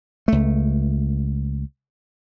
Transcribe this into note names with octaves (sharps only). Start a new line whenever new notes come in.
C#2 A3